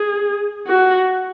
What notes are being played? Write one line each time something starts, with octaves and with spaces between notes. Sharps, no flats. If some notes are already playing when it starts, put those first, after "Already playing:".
Already playing: G#4
F#4